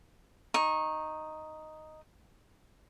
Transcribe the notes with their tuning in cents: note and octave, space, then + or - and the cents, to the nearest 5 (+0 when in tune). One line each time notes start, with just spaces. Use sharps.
D#4 +0 C#6 -20